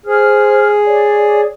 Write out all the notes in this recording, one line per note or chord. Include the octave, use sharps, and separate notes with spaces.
G#4 C5 F6
C#5 D5